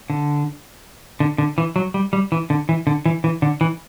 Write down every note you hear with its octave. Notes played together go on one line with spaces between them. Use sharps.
D3
D3
D3
E3
F#3
G3
G3
E3
D3
E3
D3
E3
E3
D3
E3